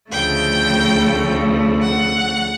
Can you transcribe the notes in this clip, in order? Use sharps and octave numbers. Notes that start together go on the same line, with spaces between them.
D2 C#3 F3 A3 G5
F#5